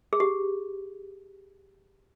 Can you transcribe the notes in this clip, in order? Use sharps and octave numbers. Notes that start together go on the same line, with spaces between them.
G#4
G4